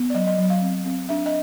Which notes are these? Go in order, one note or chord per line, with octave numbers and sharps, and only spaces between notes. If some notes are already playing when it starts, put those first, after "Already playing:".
Already playing: B3
D5
F#3 D#5
D#5
F#3
F5
C4
C4
D4 E5
D#5